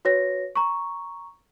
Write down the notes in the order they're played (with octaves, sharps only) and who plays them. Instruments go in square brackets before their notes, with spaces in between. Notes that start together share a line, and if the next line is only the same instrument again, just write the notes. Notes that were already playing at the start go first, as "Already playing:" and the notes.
[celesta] F#4 B4 C#5 A#6
A#5 C#6